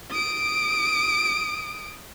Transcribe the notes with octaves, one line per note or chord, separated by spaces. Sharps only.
D#6 D7